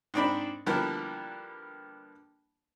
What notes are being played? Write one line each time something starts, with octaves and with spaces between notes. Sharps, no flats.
G#2 C4 D4 B5
D3 F3 G3 A#3 B3 E4